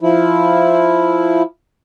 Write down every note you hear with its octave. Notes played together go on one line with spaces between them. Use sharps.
F3 E4